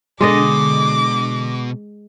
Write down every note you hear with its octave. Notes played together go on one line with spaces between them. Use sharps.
B2 D3 G#3 D5 D#5 D6 A#6